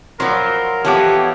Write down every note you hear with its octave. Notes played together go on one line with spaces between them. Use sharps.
F3 F#3 A#4 C5 B5
E3 F3 B3 G4 A4 C#5 F#5 D6